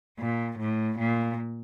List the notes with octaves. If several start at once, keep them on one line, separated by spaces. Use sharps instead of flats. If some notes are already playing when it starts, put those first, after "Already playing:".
A#2
A2
A#2